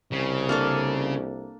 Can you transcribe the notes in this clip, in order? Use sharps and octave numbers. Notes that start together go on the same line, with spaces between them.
C2 C#3
A#3 D4 A4